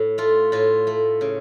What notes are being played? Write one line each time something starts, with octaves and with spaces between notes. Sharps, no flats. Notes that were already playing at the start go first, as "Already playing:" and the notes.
Already playing: A2
A3 F4
A2 F4
A3
C#3